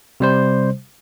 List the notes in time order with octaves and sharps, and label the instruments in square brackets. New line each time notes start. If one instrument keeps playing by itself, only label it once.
[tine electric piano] C3 G3 C5